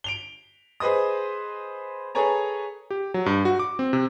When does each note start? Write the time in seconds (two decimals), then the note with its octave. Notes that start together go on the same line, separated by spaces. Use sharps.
0.04 D7 F7 G7
0.80 G#4 B4 C5 D#5 D#6
2.15 G#4 A4 B4 C#5 G#5 A#5
2.91 G4
3.14 F#3
3.26 G2
3.45 F#4
3.59 D6
3.79 C4
3.93 C3